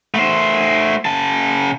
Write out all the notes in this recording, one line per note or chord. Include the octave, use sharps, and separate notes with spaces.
A3 C5
C#3 A5